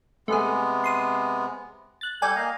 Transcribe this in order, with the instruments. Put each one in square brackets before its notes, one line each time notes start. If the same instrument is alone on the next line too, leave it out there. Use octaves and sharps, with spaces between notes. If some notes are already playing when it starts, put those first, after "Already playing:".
[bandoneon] C3 G#3 B3 [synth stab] A3 G#4
[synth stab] C6 D#6
F#6 A6
[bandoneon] G3 A4 [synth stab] D5 G5 G#5
[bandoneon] A#3 D#5 F5